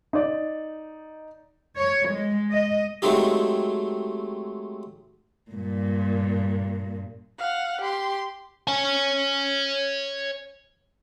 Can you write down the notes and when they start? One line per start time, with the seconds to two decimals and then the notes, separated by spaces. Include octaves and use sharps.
0.13 D#4 D5
1.78 C#5
2.09 G#3
2.51 D#5
3.02 F#3 G#3 A3 C4 D#4 G4
5.51 G2 A#2
7.39 F5 F#5
7.81 G4 C6
8.67 C#5 G#5